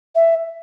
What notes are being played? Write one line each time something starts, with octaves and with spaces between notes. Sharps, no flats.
E5